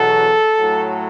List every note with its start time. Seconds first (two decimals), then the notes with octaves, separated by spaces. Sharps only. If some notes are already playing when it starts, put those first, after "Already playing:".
Already playing: E2 B2 F#3 A4
0.58 A2 F#3